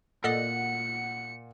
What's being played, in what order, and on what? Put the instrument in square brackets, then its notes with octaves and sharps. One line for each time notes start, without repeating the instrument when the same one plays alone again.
[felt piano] A#2 [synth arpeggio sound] A4 D5 D#5 [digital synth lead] F#5 [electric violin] C#7